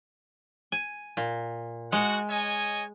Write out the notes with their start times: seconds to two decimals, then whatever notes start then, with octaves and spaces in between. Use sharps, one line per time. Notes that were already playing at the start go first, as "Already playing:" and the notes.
0.72 G#5
1.17 A#2
1.92 G#3 F#4 F#5
2.30 C#5 D#5 G#5